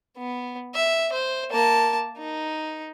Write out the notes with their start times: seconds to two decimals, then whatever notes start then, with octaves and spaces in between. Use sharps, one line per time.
0.18 B3
0.75 E5
1.13 C5
1.51 A#3 A5
2.18 D#4